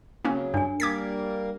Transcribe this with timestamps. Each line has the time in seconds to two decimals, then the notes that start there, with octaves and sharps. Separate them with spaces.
0.25 C#3 F#3 A#3 C4 C#4
0.54 G2 D4 G#5
0.80 G3 A#3 A#4 D6 G#6 B6